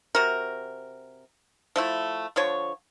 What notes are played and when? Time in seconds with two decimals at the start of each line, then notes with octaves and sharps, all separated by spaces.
0.15 C3 F#4 A#4
1.76 F3 A3 E4
2.36 D3 F3 C#5